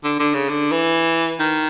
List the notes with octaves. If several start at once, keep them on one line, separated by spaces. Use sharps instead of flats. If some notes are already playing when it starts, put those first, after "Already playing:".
D3
D3
C#3
D3
E3
D#3